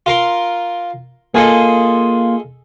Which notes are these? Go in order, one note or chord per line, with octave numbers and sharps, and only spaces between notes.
F4 A#4 C6
A#3 F4 G#4 A4 D#5